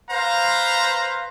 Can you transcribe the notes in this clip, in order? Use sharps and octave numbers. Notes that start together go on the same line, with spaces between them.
B4 C5 F5 A#5